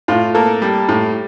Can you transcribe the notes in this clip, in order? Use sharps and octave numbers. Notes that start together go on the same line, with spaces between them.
A2 F4
A#3 A4
G3
A2